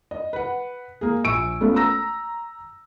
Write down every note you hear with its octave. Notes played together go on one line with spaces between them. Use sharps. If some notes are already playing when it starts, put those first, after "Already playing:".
D#5
B4 F#5
A#3 G#4
A#1 G#5 C#6 E6 D7
A3 B3 C#4 F4 A4
A#5 E6 A#6